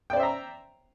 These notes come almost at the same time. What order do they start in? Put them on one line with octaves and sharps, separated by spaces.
G5 D5 C5 E5 A#5